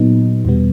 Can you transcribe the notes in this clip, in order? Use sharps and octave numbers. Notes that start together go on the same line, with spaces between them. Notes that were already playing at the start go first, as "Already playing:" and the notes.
Already playing: A#2 F#3 B3 D#4
E2 B2 G3 B3